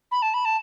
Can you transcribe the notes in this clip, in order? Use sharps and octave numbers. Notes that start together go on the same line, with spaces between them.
B5
A5
B5
A5